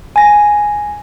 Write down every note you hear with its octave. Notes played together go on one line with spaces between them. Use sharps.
G#5 A#6